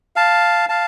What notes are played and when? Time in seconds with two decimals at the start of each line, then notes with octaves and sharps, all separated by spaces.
0.16 F5 A5
0.69 F5 A5